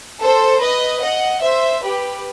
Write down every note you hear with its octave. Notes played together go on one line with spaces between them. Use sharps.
A4 C5
B4 D#5
D#5 F#5
C5 E5
G4 B4